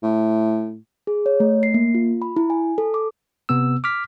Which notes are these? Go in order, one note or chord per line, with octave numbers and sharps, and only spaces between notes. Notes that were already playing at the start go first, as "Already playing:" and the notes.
A2
G#4
C#5
A3
C7
A#3
F4
B5
E4
G#5
A4
D6
C3 B3 E6
D6 F6 B6